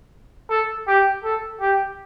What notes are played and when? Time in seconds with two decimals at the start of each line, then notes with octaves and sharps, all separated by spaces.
0.50 A4
0.88 G4
1.24 A4
1.61 G4